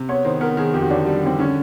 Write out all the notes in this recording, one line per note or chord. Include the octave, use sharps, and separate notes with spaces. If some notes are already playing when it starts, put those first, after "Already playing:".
Already playing: C3
B3 C#5
D#3 C5
B3 A#4
D#3 G#4
F2 G4
F#4
D3 D4
G3
D3 C4
D3 C#4